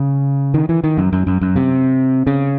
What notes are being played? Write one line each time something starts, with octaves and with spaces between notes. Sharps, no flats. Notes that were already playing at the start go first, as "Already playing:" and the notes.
Already playing: C#3
D#3
E3
D#3
F#2
F#2
F#2
F#2
C3
C#3